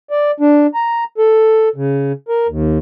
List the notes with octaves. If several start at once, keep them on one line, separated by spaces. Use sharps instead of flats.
D5
D4
A#5
A4
C#3
A#4
D#2